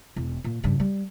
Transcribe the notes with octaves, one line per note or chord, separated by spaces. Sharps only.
E1
A#2
G2 C#3
G3